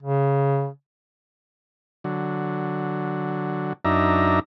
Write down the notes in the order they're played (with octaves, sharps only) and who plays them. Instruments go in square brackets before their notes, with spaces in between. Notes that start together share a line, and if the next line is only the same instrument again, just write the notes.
[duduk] C#3
[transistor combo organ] D3 F#3
F#2 D4 D#4 E5 A#5